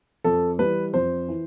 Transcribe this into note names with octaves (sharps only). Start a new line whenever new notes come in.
F2 A4
E3 G3 B4
F2 C5
E3